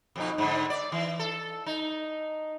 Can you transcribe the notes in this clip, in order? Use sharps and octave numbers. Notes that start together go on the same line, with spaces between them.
F2 B2 D#4
G#2 D3
D5
E3
A4
D#4